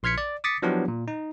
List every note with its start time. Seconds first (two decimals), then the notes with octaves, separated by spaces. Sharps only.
0.03 A#1 C6 F6 G#6 B6 C#7
0.18 D5
0.44 D6 D#6 A6 B6 C#7
0.62 F3 F#3 B3 D4 E4 G4
0.88 A#2
1.08 D#4